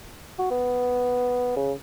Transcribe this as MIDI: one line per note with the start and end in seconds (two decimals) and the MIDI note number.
0.39 0.48 66
0.51 1.55 59
1.56 1.73 49